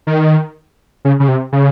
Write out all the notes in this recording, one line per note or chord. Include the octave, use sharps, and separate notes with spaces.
D#3
C#3
C#3
C3
C#3